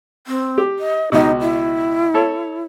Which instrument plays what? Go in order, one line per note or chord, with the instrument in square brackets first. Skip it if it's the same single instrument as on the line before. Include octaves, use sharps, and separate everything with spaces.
[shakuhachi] C4
[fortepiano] G4
[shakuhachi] D#5
[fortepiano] C#2 B2 [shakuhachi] D#4
[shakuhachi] E4
[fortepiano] A4 C#5